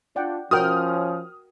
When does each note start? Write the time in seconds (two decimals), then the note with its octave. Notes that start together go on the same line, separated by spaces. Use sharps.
0.16 D4 F4 D5 F#5 G5
0.51 F3 C#4 F#4 A#4 G5 D#6 F6